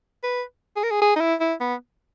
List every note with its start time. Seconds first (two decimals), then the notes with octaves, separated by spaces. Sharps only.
0.24 B4
0.76 G#4
0.83 A#4
0.91 G#4
1.02 G#4
1.16 D#4
1.21 E4
1.40 E4
1.61 B3